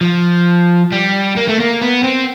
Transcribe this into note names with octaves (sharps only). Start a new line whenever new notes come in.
F3
G3
A#3
A3
A#3
B3
C4